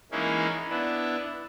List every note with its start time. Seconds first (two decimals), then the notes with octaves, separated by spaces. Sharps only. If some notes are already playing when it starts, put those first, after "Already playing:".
0.12 E3 G#3 A#3 C#4 D#4 E4
0.70 B3 D4 E4